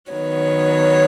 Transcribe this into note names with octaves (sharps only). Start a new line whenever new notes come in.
D#3 F#3 B3 C#5